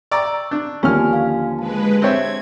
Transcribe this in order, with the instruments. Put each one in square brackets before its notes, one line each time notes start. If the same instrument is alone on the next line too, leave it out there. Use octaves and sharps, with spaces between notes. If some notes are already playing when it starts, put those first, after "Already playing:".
[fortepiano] D5 A#5 D6 [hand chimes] C#6 E6
[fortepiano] D4
[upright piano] D#2 D3 F3 [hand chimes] B3 G#5 [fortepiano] C#4 F6
[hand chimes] F5 G#5
[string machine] G#3 B4 [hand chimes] A5
[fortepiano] C4 C#5 E5 [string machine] G#6